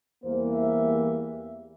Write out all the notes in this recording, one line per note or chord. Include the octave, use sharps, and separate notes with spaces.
E2 E3 G3 A#3 C5
E5